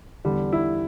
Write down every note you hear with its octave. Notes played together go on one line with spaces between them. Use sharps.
E2 D3 G3
E4